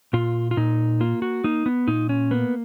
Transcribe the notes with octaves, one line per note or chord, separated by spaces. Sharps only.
A#2 F4
F4
A#2 D#4
A#3 F4
F#4
A#3 D#4
B3
A#2 D#4
C#4
A#3 B3